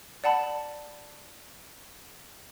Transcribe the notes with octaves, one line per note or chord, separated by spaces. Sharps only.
D5 F#5 A5 B5